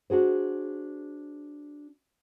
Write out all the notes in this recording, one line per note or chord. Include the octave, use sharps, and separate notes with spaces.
D4 F#4 G#4 C5